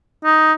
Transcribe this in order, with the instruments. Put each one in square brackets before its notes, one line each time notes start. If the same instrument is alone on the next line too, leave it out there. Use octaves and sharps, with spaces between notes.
[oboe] D#4